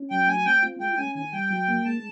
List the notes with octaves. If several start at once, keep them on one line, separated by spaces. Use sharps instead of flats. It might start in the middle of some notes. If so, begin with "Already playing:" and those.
Already playing: C#4
F#3 G5
A3 G#5
C4 G5
F4
G#3 G5
C#4 G#5
D#3 G#5
G3 G5
F#3
A#3
G#3 A5